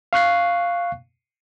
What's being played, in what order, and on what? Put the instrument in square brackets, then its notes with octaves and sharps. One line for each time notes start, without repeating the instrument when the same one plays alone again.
[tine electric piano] F5 C#6 F#6 C7